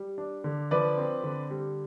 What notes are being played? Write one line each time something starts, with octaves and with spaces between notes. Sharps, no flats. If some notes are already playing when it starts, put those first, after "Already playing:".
Already playing: G3
D4
D3
F3 B4 D5
C4
D3
G3